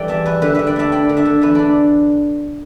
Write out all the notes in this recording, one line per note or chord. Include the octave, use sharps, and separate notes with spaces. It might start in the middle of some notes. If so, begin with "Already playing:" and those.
Already playing: E3 G3 A4 D5 G5
E2 E5 A5
E2 B4 E5
D3 B4 E5
D3 B4 E5
D5 G5
A3 E5 A5
D4 G5 B5
D3
E5 A5
D3
E2 B4 E5
D4 A4 D5